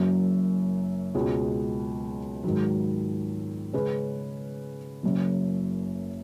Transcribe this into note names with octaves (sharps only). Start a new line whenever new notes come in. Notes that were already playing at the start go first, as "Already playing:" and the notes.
Already playing: F#1 F#2 F#3
C#2 B2 G#3
G#2 D#3 F#3
C#3 G#3 C#4 G#4 B4
F#1 F#2 C#3